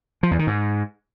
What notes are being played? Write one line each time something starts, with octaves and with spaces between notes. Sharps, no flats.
F3
E2
D#3
G#2